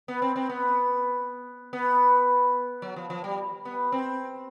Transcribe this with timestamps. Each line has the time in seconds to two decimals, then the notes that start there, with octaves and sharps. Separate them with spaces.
0.08 B3
0.22 C4
0.36 C4
0.49 B3
1.73 B3
2.82 F#3
2.96 F3
3.10 F3
3.24 G3
3.65 B3
3.92 C4